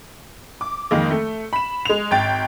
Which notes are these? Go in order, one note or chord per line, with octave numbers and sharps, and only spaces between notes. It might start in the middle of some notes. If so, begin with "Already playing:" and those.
D6
F2 D#3 G#3 A#3
A3
B5 E7
G#3 F7
G#1 G5 A6